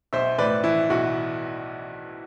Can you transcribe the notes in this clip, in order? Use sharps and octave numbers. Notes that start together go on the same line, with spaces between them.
B1 C5 E5
A2 B4 D5
E3 E4
B1 F#4